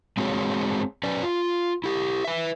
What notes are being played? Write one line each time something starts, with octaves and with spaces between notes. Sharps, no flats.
G#3 C4 F#4 G#4 C#5
C#4 B4 D5
F4
E4 G4
B4 E5